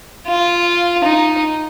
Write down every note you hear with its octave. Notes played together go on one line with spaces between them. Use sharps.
F4
D#4